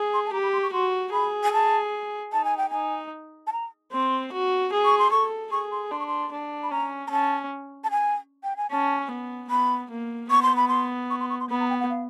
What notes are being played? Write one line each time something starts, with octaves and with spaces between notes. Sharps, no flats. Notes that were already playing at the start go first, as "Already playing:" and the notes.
Already playing: G#4
C6
A5
G4 A#5
B5
C6
C#6
F#4 C6
G#4 B5
G#5
A5
D#4 A5
G#5
G5
D#4 G#5
A5
A#5
C4 C6
F#4
G#4
C#6
C6
A4 C#6
G#4 C#6
C6
D4 C6
C#6
C6
D4
B5
C#4 A#5
A#5
C#4 A5
A5
G#5
G5
G#5
C#4 A5
B3
B3 B5
A#3
B3 C#6
C6
B5
C6
C#6
C6
C#6
C6
B3 B5
A#5
G5
F#5
F5